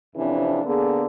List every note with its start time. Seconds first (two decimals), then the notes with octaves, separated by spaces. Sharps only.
0.16 F2 C3 E3 C#4 D4
0.65 D3 A#3 B3 G#4